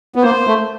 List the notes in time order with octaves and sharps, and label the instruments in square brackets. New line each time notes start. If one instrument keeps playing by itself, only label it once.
[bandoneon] B3
[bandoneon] A#3 [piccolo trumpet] C5
[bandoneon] A3